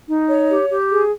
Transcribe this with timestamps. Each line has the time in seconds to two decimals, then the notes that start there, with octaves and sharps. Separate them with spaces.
0.07 D#4
0.27 C#5
0.49 G4
0.69 G4
0.91 G#4